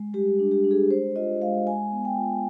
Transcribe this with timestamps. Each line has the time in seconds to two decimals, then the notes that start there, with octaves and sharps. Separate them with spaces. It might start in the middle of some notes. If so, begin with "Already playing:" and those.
Already playing: G#3
0.13 G3 G4
0.39 D4
0.52 G4
0.64 D4
0.71 G#4
0.90 G#3 C5
1.16 F4 D#5
1.42 G#3 F5
1.66 G#3 G#5
1.92 B3
2.05 G5
2.18 F4